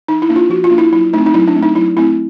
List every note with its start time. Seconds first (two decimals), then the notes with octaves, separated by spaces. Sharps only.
0.08 F3 D#4
0.22 E4
0.29 A#3 D4
0.36 F4
0.50 F3 F#4
0.64 F4
0.71 A#3 D4
0.78 E4
0.92 F#3 E4
1.13 A3 D#4
1.18 C4
1.26 D#4
1.34 F#3 E4
1.48 D4
1.55 A3 C4
1.63 D#4
1.76 F#3 E4
1.97 A3 C4 E4